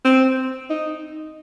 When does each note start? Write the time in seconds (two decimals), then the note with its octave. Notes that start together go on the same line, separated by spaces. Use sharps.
0.05 C4
0.70 D#4